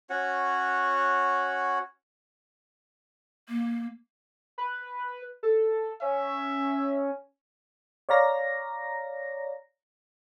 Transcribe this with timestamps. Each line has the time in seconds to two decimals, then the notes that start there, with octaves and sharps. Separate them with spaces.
0.10 C#4 F#4 C#5 F#5
3.49 A#3
4.58 B4
5.43 A4
6.02 C#4 E5
8.09 C#5 D5 F5 A#5 A#6